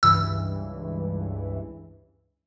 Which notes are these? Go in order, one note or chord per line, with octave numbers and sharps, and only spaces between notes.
C#2 G2 E3 E6